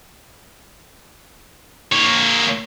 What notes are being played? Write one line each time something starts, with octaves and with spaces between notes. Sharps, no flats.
A#3 C#5